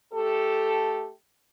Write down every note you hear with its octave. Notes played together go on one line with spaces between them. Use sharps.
A3 G4 A4